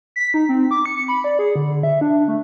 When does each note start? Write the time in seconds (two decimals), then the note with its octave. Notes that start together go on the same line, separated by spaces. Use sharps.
0.16 B6
0.34 D#4
0.49 C4
0.71 D6
0.86 C#7
1.08 B5
1.24 D5
1.39 G#4
1.56 D3
1.83 E5
2.01 D4
2.28 A3